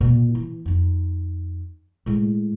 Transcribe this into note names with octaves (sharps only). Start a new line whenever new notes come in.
A#2
E3
F2 D#4
A2 G#3